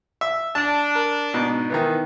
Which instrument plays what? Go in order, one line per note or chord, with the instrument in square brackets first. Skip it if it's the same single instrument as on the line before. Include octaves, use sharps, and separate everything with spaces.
[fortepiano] E5
[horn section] D4 [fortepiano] A5
[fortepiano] A#4
G#2 B2
D#3 E3 B3